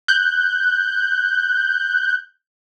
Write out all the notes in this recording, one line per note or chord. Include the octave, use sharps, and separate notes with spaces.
F#6 G6